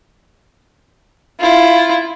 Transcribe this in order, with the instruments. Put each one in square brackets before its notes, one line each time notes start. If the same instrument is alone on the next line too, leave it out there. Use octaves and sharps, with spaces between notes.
[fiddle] E4 F4